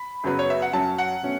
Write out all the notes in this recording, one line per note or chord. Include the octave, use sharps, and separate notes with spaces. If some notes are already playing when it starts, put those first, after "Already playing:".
Already playing: B5
F#2 C#3 F#3 B3 B4
C#5
E5
F#5
F#2 F#3 C#4 A5
F#5
B2 A3 C#4